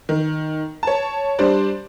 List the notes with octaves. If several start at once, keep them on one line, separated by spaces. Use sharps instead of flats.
D#3
C#5 A5
G3 D4 C5 D5